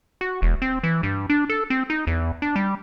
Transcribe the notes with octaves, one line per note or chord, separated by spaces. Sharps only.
F#4
E1
C4
E3
G2
D4
A4
C4
D#4
E2
D4
G3